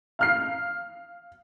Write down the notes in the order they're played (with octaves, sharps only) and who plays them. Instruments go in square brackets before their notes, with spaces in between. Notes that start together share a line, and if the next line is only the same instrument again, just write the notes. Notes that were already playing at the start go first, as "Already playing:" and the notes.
[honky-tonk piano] F5 F6 C7